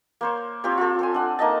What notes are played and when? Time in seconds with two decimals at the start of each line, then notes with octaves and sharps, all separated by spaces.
0.21 A#3 C5 C#5
0.64 C4 F4 G4 C#5
0.78 F4 A4
0.99 A4 C5 G#5
1.14 D4 F#5
1.39 A#3 D#4 D#5 A5